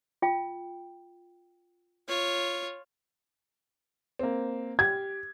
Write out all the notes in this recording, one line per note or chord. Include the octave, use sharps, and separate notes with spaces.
F4 G5
F4 C#5
A#3 C4
G4 G#6